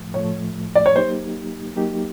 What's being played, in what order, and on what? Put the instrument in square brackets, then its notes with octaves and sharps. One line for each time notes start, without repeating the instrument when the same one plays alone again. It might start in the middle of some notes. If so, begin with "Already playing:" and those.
Already playing: [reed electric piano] A2 F3 A3
[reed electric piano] A2 F3 A3 [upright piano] C#5
[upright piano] D5
C#5
[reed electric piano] F#3 A#3 D#4 G4 [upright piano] C5
[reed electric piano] F#3 A#3 D#4 G4